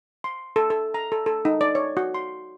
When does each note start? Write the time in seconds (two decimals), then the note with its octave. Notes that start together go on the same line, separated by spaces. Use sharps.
0.24 C6
0.56 A4
0.70 A4
0.94 A#5
1.12 A4
1.26 A4
1.45 D#4
1.61 D5
1.75 C#5
1.97 F#4
2.14 C6